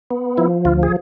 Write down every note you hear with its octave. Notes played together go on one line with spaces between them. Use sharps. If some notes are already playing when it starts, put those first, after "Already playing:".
B3
F3 E4
D2 F4
G#4